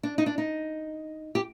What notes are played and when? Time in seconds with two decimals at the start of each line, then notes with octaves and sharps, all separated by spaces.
0.03 D4
0.18 D#4
0.26 D4
0.38 D#4
1.35 G4